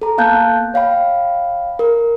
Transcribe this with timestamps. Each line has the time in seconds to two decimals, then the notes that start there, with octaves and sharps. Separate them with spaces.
0.02 A4 A#5
0.18 A#3 B3 F5 A5 F#6 G6
0.74 C#5 F5 G5 B5
1.79 A#4